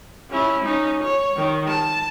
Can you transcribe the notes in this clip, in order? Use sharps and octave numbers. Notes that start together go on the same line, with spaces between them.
C#4 E4
C#4 D#4
C#5
D#3
A5